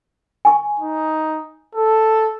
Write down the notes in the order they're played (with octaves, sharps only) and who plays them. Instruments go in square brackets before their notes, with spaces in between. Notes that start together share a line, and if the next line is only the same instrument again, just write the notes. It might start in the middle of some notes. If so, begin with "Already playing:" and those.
[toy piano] G#5 C#6
[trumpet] D#4
A4